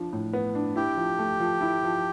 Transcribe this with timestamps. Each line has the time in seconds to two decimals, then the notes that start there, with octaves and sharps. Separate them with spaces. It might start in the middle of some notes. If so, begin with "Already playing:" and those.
Already playing: F3 D4
0.13 A2
0.33 B3
0.55 D4
0.76 E4 G4
0.97 F3
1.19 A3
1.40 F3
1.61 E4
1.84 F3